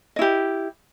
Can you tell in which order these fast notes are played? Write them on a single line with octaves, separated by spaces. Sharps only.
D#5 E4 G4